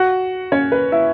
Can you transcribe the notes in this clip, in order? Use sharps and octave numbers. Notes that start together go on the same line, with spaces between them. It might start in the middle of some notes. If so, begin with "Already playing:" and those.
Already playing: F#4 F#5
C#4 C#5
B4
E4 E5